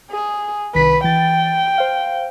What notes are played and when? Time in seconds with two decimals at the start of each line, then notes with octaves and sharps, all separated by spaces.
0.11 G#4
0.75 C2 D#3 B4 B6
1.04 E3 G5 A6
1.78 C5 F5